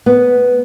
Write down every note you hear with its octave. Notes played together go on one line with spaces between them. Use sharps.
B3